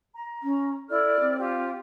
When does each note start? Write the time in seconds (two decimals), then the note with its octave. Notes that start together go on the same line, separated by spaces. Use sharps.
0.13 A#5
0.43 C#4
0.89 E4 A4 D5 F6
1.20 C4
1.38 F4 G4